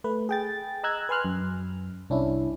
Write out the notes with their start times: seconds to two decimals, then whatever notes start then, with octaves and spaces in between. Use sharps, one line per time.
0.04 A3 B4
0.29 G#4 G5 A6
0.83 D#5 A#5 E6 F#6 G#6
1.09 B4 G#5 C6 F6 F#6
1.25 F#2
2.10 C2 C#4 D4 E4